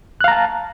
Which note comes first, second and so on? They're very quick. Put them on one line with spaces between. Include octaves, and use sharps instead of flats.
F#6 F5 A#5 A5